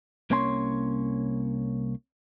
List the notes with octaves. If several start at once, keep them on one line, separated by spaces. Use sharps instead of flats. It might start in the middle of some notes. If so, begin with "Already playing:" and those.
C2 A#3 C#4 C#5 G#5 C6